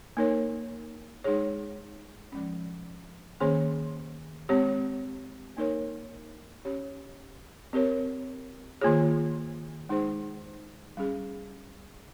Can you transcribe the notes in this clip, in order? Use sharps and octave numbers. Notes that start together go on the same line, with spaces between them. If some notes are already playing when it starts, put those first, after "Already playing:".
A#3 D#4 A#4 C#5
G#3 D#4 G#4 C#5
F3 G#3 C#4
D#3 A#3 C#4 G#4 C#5
G#3 C4 G4 C#5
A#3 D#4 A#4 C#5
C#4 G4 C#5
C4 G4 A#4 C#5
D#3 A#3 F4 G#4 C#5
G#3 D#4 G#4 C5
G3 C#4 G#4